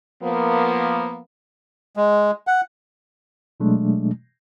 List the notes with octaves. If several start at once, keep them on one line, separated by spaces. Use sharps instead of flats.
F3 A#3 B3
G#3
F#5
B2 F#3 G#3 A3 D4